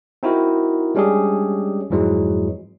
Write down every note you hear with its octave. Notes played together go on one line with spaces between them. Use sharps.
C4 D#4 E4 F#4 A#4
G3 G#3 C#4 D4 G4 G#4
F2 G#2 E3 F#3 G#3